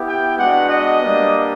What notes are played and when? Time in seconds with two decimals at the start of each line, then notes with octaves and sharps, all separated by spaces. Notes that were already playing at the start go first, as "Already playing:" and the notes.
Already playing: B3 E4 G4
0.08 G5
0.38 G#3 B3 D4 F#4 F#5
0.70 D#5
1.02 G3 A#3 D4